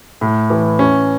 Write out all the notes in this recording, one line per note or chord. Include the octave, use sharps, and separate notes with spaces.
A2
E3
C#4